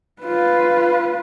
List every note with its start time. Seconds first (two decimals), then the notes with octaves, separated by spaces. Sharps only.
0.22 F4 B4